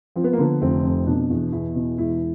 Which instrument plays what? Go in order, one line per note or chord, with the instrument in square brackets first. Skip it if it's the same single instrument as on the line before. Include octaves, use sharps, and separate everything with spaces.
[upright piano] F3 C4
B3
A#3
D3 B3
F1 C4
F2
B2 D4
E2
E2 E4
B2
E1 E4